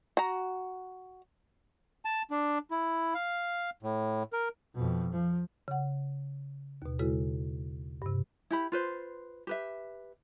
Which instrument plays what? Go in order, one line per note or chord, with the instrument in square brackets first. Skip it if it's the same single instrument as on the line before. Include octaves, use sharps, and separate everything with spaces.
[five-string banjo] F#4 A#5
[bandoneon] A5
D4
E4
F5
A2
A#4
[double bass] F2 B2
F3
[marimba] C#3 F#5
D#2 B2
C#3 G#3 E4 F#4 A4
G2 C3
[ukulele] E4 G4 B5
F4 B4 C5
G4 B4 E5